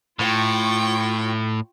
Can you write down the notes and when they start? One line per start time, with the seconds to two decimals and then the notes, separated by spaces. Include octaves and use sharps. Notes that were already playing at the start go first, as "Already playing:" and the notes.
0.19 A2 F4 G5 C#6